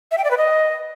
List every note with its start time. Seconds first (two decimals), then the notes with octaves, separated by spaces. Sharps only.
0.11 E5
0.18 G5
0.24 D5
0.31 B4
0.37 D#5